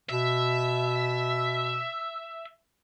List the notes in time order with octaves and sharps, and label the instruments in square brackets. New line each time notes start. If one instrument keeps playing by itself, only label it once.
[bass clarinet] B2 [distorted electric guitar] E5